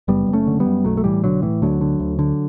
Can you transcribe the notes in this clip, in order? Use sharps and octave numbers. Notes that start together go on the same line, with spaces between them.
F#1 G3 B3
F#1
A3 C#4
D3
G3 B3
F#2
B1 F#3 A3
A3
A2 E3 G3
B1 D3 F#3
A2 E3
D2 D3 F#3
D3
D2
D3